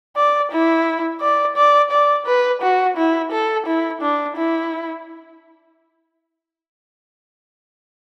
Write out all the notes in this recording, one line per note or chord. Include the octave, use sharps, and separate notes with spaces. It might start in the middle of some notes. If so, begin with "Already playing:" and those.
D5
E4
D5
D5
D5
B4
F#4
E4
A4
E4
D4
E4